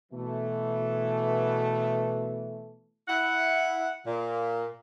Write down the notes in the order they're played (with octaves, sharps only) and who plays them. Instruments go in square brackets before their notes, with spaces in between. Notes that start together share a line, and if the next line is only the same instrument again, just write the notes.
[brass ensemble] B2 E3 A3
[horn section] E4 F#5
A#2